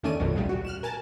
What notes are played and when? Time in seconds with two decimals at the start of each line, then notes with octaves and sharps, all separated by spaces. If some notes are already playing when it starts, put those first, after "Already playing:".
0.03 E2 D#3 A3 C#4 D5 D#7
0.20 A#1 F2 B2 D#3 F#3
0.35 D2 A#2 C#3 G3
0.49 F#4
0.65 F6 F#6 E7
0.83 A#4 G#5 A5